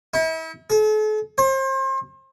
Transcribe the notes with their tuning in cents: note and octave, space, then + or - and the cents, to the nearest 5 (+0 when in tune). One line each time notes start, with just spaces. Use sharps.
E4 -40
A4 -45
C5 +35